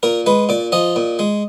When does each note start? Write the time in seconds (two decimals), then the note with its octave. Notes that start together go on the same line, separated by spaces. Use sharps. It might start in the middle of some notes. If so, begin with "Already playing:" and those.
0.03 A#2 A#4
0.26 G#3 B4
0.49 A#2 D5
0.72 F3 D#5
0.96 A#2
1.19 G#3